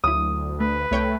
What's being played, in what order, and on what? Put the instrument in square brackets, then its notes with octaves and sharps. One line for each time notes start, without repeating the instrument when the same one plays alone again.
[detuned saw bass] D2 [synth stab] F#3 E4 [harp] D#6
[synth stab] A3 [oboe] B4
[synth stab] C2 C#5 G5 [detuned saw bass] A3